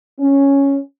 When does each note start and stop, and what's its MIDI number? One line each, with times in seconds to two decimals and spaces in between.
0.20 0.78 61